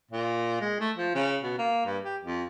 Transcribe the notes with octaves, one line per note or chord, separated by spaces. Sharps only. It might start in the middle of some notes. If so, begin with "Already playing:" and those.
A#2
G#3
A3
F3
C#3
B2
A#3
G2
G4
F2